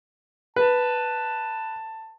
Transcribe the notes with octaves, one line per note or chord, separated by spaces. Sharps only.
B4 A5